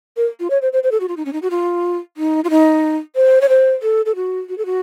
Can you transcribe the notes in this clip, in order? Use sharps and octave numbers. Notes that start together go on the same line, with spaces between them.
A#4
F4
C#5
C5
C5
C5
A4
F#4
F4
D#4
C#4
D#4
F#4
F4
D#4
F4
D#4
C5
C#5
C5
A4
A4
F#4
F#4
A4
F#4